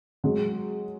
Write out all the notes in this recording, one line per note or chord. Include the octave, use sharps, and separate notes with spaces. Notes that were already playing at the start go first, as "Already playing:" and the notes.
F#3 G#3